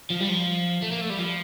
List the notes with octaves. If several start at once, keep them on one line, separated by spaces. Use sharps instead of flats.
F3
G3
F3
A3
A#3
A3
G3
F3